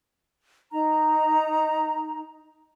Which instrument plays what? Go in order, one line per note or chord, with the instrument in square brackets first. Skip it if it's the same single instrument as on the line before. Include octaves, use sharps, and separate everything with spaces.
[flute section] D#4 A#5